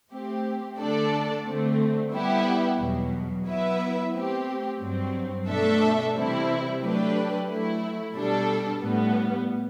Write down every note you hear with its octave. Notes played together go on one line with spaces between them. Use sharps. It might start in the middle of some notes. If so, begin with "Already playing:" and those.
A3 C4 G4
D3 A3 D4 A4 D5
D3 A3 C4
G3 B3 E4 G4
E2 B2 F#3
F#3 B3 E4 B4 E5
A3 C4 G4
G2 F#3 C4
B2 A3 D4 A4 E5
C3 E3 G3 C4 E4
F#3 A3 D4 G4 B4
F#3 A3 E4
B2 G3 D4 A4
A2 G3 B3